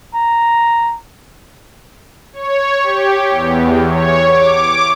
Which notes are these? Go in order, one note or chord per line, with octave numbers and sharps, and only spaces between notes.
A#5
C#5
G4
E2
C#5
D6